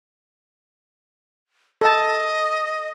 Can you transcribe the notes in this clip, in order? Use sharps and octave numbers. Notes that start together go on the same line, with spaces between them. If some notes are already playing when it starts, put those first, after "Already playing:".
A4 D#5 A5